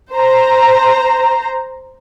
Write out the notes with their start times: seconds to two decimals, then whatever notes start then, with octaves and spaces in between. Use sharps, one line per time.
0.12 C5 A#5